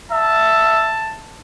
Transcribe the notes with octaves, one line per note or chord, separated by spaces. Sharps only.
E5 A5